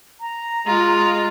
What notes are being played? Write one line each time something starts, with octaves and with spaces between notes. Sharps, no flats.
A#5
G#3 F4